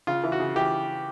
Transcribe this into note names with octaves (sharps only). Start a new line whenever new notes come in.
C#3 F4
E3
F#4
C#3
E3 G4